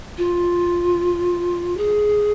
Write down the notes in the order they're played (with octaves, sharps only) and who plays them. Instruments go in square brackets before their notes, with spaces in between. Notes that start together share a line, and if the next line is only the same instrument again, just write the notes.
[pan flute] F4
G#4